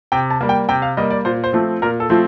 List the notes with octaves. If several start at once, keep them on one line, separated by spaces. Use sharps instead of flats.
C3 G5
A5
G3 A#3
G5
C3 G5
F5
G3 A#3 D#5
D5
A#2 C5
C5
F3 A3 C4
A#2 A#4
A4
F3 A3 C4